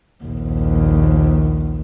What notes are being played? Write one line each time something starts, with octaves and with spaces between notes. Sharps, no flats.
A#1 D#2